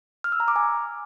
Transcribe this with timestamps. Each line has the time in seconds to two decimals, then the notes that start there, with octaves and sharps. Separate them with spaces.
0.24 F6
0.32 E6
0.40 A#5
0.48 D6
0.56 G#5